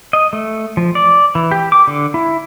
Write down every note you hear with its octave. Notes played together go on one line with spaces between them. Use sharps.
D#5
A3
F3
D5
E3
G4
D6
D3
E4